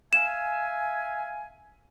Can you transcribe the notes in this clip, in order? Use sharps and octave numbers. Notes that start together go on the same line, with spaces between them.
E5 F5 G#5 E7